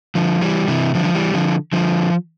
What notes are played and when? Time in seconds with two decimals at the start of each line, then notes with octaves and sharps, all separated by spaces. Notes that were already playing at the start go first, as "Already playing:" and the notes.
0.15 D3 F3
0.41 E3 G3
0.68 C3 E3
0.95 D3 F3
1.05 F3
1.14 E3 G3
1.34 D3 F3
1.73 D3 F3